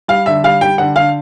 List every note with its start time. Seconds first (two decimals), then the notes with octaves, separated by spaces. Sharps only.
0.08 G3 F5
0.26 D3 E5
0.44 G3 F5
0.61 G3 G5
0.78 D3 F#5
0.96 D3 F5